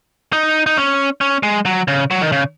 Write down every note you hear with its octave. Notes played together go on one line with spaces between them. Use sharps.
D#4
D#4
C#4
C#4
G#3
F#3
C#3
F#3
D#3
C#3